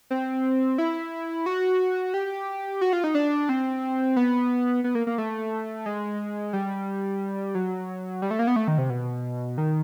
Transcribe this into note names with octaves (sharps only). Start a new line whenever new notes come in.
C4
E4
F#4
G4
F#4
F4
D#4
D4
C4
B3
B3
A#3
A#3
A3
G#3
G3
F#3
G3
A3
A#3
B3
A3
D#3
C3
B2
D#3